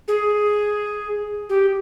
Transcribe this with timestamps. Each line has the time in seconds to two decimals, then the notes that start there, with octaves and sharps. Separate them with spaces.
0.08 G#4
1.49 G4